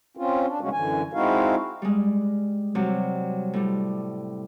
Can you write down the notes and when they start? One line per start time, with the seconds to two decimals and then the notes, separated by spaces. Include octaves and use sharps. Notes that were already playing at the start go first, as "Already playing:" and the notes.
0.17 C4 C#4 F4
0.46 D4
0.61 C3 G3 G#3 A#3 C#4 F#4
0.73 F#2 D3 E3 G#5
1.13 G#3 C4 D#4 E4 F#4 F5
1.82 G3 G#3
2.75 C3 F#3 G3
3.53 A2 G3